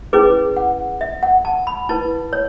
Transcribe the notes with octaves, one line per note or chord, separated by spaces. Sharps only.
C#4 E4 G#4 B4 D6
F#5
E5
F#5
A5
B5
E4 B4 A5
C#5